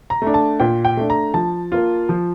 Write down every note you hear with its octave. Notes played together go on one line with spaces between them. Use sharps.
A#5
A3 D4
A5
A#2 G5
G5
A3 D4
A#5
F3 A5
A#3 F4
F3